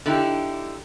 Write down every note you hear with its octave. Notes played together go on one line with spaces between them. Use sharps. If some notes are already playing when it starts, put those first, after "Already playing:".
D3 D#4 E4 G4